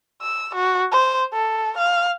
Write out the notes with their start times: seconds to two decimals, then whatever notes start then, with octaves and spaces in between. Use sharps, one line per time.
0.22 E6
0.55 F#4
0.92 C5
1.33 A4
1.78 F5